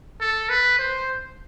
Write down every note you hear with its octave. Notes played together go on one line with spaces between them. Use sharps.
A4
B4
C5